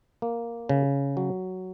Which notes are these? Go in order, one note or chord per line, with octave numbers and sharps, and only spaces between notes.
A#3
C#3
F#3